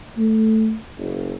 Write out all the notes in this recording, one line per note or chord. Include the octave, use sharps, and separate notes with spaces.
A3
F#1